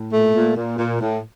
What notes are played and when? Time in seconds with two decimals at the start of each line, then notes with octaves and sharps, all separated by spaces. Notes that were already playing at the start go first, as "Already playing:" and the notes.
Already playing: A2
0.11 A#2 A3
0.34 A#2
0.56 A#2
0.78 A#2
1.01 A2